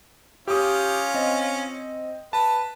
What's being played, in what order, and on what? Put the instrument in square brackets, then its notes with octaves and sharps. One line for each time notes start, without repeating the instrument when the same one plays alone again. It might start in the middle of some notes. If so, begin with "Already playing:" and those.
[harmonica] C#4 F4 [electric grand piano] G4 D#6
[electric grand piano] C4 D#5
[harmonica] B4 [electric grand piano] A5